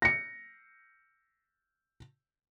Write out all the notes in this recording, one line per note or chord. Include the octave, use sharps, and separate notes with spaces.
A#6 C#7